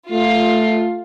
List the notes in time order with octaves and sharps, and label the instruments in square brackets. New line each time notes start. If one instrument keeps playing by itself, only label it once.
[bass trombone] A3 [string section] F4